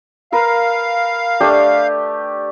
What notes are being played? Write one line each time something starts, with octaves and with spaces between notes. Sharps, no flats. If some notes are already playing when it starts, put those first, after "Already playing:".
A#4 B4 F5
A3 D4 G4